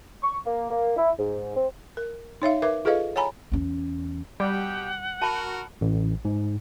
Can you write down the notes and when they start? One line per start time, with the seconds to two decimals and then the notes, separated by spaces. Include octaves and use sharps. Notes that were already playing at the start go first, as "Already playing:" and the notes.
0.23 C#6
0.46 A#3
0.70 A#3
0.97 E4
1.19 G#2
1.56 C4
1.97 A#4
2.42 D#4 C#5 E5 F5
2.62 A#4 B4 E5 D6
2.85 F4 G#4 A4 B4 D#5 F5
3.16 C#5 F#5 G#5 A#5 B5
3.52 E2 C#4
4.40 B2 G3 G4 F#5 G5
5.22 F#4 A#4 A5 B5
5.81 A1
6.25 G#2